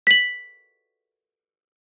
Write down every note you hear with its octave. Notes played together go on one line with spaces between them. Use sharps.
B6 F#7